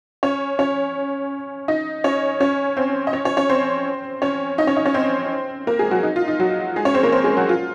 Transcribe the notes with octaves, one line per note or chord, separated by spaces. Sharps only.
C#4 C#5
C#4 C#5
D#4 D#5
C#4 C#5
C#4 C#5
C4 C5
D#5
C#4 C#5
C#4 C#5
C#4 C#5
C4 C5
C#4 C#5
D#4 D#5
C#4 C#5
D#4 D#5
C#4 C#5
C4 C5
A#3 A#4
G#3 G#4
F#3 F#4
D#4
F4
D#4
F#3 F#4
G#3 G#4
C#4 C#5
C4 C5
A#3 A#4
C4 C5
G#3 G#4
F#3 F#4
F4